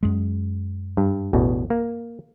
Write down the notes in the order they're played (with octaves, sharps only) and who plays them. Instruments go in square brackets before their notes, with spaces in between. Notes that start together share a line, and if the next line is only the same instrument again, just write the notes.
[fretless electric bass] F#2 G#3
[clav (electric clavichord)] G2
A1 E2 B2
A#3